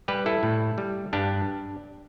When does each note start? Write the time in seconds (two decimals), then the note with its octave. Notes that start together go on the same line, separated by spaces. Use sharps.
0.08 G3 G4 B4
0.26 E4 A4
0.43 A2
0.78 G3
1.13 G2 D4 G4